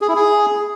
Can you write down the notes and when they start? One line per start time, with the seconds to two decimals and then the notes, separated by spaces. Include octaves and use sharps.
0.01 G#4
0.08 E4
0.16 G#4